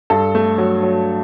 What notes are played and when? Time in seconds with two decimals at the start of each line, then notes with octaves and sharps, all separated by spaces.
0.10 G2 A4
0.35 A3
0.58 F#3
0.83 F#3